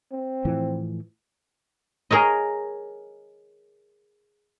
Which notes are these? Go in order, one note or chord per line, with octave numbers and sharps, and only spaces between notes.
C4
A2 E3 F3
G#4 A#4 C#5 D#5